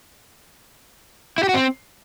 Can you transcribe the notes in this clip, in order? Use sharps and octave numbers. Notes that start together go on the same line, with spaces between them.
E4
G4
F#4
C4